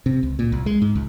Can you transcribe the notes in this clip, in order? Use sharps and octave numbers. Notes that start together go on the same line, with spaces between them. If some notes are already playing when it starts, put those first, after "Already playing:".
C3
C#2
A#2
C2
G#3
G#2
C#2